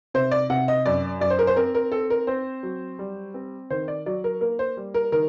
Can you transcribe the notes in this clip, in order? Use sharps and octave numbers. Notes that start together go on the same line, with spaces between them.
C3 C5
D5
C3 F#5
D#5
F#2 D5
F#2 D5
C5
A#4
C5
C4 A#4
A#4
C4 A4
A#4
C4 C5
F#3
G3
C4
D#3 C5
D5
F#3 D5
A#4
A#3 A#4
C5
G3
A#4
D#3 A#4